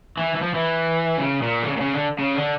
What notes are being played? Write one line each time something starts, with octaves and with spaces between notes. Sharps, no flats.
E3
E3
F3
E3
C#3
A#2
D3
C#3
A#2
C#3
D3
C#3
D3